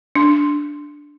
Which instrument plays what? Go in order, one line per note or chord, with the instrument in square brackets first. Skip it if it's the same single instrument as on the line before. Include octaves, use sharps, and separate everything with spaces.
[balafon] D4